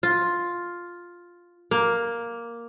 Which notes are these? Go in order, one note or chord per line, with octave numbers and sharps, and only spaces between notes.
F4
A#3